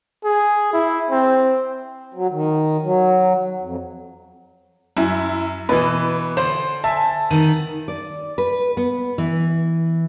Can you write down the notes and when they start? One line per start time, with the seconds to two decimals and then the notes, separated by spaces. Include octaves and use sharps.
0.24 G#4
0.73 E4
1.10 C4
2.14 F#3
2.31 D#3
2.83 F#3
3.61 F2
4.97 F#2 E4
5.69 B2 E3 B4
6.37 D3 C5
6.84 E5 G#5 A5
7.31 D#3 B3 D#7
7.88 D5
8.38 B4
8.77 B3
9.18 E3